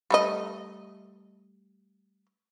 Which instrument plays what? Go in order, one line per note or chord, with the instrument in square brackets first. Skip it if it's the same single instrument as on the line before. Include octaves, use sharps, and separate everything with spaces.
[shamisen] G3 A3 D#5